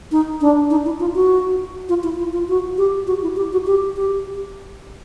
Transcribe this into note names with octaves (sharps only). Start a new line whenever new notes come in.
D#4
D4
D#4
E4
F4
F#4
F4
E4
F4
F4
F#4
G4
F#4
E4
G4
F#4
G4
G4